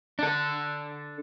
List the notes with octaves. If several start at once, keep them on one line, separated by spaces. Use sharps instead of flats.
D4 A4